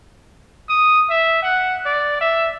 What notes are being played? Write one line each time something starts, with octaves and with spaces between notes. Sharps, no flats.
D#6
E5
F#5
D5
E5